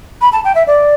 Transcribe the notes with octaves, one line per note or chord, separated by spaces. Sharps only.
B5
A5
G5
E5
D5